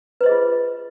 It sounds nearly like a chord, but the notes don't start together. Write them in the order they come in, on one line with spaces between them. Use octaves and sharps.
B4 C5 D#5 G#4 F4